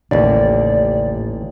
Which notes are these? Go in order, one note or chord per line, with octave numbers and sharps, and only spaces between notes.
A1 D#2 A2 C#3 C#4 D5